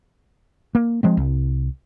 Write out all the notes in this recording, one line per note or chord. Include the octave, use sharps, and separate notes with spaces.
A#3
F3 G#3 C4
C2